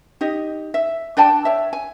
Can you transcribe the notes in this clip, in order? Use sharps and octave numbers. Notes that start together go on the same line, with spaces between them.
D#4 G4 D#5
E5
D4 D5 G5 A5
C#5 E5
G#5